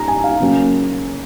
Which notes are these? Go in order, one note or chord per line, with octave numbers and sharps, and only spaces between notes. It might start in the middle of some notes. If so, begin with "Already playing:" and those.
Already playing: A#5
G#5
F5
C#3 F#3 A#3 C#4